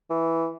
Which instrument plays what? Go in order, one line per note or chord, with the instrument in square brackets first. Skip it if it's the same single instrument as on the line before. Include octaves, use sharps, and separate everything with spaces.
[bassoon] E3